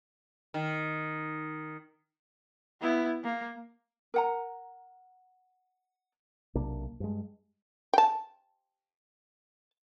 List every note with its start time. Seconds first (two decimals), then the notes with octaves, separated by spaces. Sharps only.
0.54 D#3
2.81 B3 E4
3.24 A#3
4.14 A#4 F#5 A#5
6.55 B1 C3 A#3 D4
7.00 G2 G#3
7.94 G5 A5